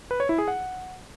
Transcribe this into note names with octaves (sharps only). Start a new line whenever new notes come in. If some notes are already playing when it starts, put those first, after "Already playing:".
B4
C#5
E4
G#4
F#5